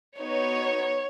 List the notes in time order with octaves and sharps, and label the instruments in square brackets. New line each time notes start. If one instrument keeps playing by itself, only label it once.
[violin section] B3 D#4 F#4 C#5